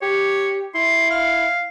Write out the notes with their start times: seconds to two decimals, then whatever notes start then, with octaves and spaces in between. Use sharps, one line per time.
0.02 G4 C#5
0.75 E4 C6
1.10 F5